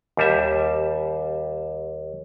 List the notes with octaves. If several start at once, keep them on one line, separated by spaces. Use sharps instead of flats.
D#2 G3 E5